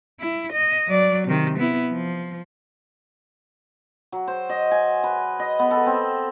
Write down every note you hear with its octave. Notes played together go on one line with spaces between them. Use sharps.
E4
D#5
F#3 D5
C3 D#3
B3 E4
F3
F#3
C5
D#5
G#5
B4
D#5
B3
A4
C4